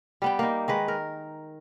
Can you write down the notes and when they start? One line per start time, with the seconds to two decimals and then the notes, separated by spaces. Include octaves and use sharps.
0.22 G3 B3 G5
0.39 A#3 D#4
0.68 D#3 G#3 B4
0.88 A#4